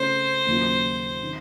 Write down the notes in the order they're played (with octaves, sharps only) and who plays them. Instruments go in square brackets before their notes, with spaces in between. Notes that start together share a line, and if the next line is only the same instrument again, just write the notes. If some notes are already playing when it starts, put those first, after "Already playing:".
Already playing: [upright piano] C#3 A3 C4 F4 [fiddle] C5
[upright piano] D#2 C#3 F#3 A#3 F4
C3 D#3